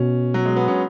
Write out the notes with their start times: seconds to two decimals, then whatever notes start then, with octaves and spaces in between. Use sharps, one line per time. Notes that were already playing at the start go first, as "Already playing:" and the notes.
Already playing: B2 C#4
0.34 F#3
0.45 G#3
0.56 B3
0.68 C#4